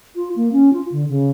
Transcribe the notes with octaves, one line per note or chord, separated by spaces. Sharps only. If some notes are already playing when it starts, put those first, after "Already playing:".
F4
A#3
C#4
F4
D3
C#3